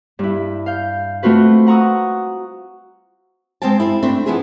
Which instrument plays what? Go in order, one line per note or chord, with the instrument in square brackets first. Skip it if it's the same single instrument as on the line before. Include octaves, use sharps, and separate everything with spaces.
[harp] G2 E4
F5 G6
A3 C4 F4 F#4 B4
F#5 A#5 C#6 D#6 E6
[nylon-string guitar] G#3 C4 C5 F5 G5 A5
E4 A4 F5
A3 C4 D4 A4 E5
F3 B3 D4 E4 G#4